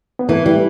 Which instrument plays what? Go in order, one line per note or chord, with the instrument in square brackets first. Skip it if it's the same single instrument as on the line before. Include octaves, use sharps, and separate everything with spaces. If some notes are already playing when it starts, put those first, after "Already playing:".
[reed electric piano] B3
[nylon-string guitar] E3 [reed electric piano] A3
[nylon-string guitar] E3 [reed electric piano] G3